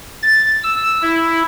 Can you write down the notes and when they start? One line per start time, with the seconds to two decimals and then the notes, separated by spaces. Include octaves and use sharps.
0.22 A6
0.63 E6
1.02 E4